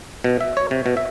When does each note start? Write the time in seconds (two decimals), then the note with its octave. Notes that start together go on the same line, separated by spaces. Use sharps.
0.24 B2
0.41 E5
0.57 C#5
0.71 C3
0.86 B2
0.97 E5